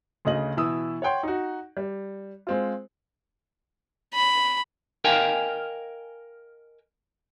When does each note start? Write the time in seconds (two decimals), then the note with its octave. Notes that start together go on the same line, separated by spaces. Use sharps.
0.25 D2 C#3 D#5 F#7
0.57 B2 E3 E4 D#6 E6
1.02 C#5 F#5 G5 C6
1.23 D#4 F#4
1.77 G3
2.47 G#3 C4 F4
4.14 B5
5.05 A#4 D#5 F5 G5 G#5